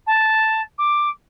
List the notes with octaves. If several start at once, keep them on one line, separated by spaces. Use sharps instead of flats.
A5
D6